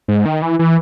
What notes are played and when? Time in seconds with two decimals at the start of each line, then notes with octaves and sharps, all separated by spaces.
0.08 G#2
0.25 D#3
0.42 E3
0.59 E3